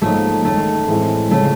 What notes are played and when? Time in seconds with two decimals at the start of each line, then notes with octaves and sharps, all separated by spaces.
0.02 G#2 F3 A3 A#3 D#4
0.45 F#2 D#3 G#3 A3
0.88 A2 E3 G#3 C4 E4
1.31 C#3 F3 G#3 A3 C#4